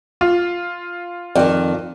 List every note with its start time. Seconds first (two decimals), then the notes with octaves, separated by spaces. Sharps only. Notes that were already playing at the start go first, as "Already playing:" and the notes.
0.21 F4
1.35 F2 D#3 D5